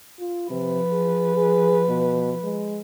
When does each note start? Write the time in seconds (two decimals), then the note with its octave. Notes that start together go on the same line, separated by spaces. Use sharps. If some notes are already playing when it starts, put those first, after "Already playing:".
0.20 F4
0.50 C3 F3 B4
0.92 G#4
1.36 G#4
1.89 B2
2.43 G#3